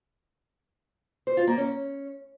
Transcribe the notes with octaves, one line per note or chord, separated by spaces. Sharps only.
C5
F4
A#3
C#4